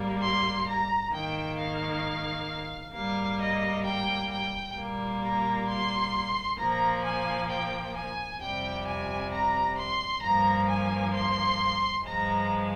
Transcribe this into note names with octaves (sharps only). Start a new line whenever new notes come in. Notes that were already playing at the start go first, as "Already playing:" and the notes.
Already playing: G#2 G3 A#3
C6
A#5
G#2 D#3 A#3 G5
F5
G#2 G3 A#3 F5
D#5
G5
G5
A#2 G3 A#3
A#5
C6
A#2 F3 A#3 A#5
G#5
G5
G#5
F2 C3 G3 G5
G#5
A#5
C6
G2 F3 A#3 A#5
G#5
C6
G2 F3 G#3 A#5